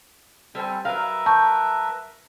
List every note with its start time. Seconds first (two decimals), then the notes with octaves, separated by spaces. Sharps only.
0.55 G3 C4 A4 G#5
0.85 F#3 A#4 B4 E5 F5
1.26 A5 C#6 G6